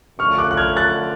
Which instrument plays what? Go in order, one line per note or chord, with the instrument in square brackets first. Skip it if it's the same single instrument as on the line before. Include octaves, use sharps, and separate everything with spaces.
[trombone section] F#2 D3 F3 A3 D4 [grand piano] C#6 F6
[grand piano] D6 F#6
F#6
F6 G#6
F#6 A6